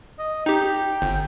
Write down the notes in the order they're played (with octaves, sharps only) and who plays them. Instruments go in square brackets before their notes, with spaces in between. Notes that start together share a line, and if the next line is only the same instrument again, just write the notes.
[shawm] D#5
[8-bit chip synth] D#4 G4 [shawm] G5
[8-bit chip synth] G1